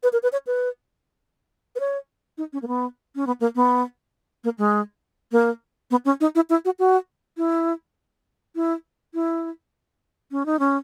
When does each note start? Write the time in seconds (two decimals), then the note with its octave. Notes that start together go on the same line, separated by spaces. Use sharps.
0.03 B4
0.13 A#4
0.23 B4
0.32 C#5
0.47 B4
1.76 B4
1.80 C#5
2.38 D#4
2.53 C#4
2.62 A#3
2.68 B3
3.16 C#4
3.27 B3
3.41 A#3
3.56 B3
4.44 A#3
4.58 G#3
5.32 A#3
5.91 B3
6.05 C#4
6.21 D#4
6.35 E4
6.50 E4
6.65 F#4
6.79 F#4
7.37 E4
8.56 E4
9.14 E4
10.32 C#4
10.46 D#4
10.59 C#4